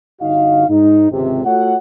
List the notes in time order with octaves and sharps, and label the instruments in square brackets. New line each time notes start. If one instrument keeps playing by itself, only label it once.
[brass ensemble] G1 D3 D#4 F#4 D#5 F5
G#2 D#4
G#1 C#2 C3
A3 F4 F#4 A4 C#5 F#5